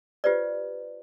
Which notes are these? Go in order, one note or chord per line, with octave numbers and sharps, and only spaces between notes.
F4 G4 B4 C5 D5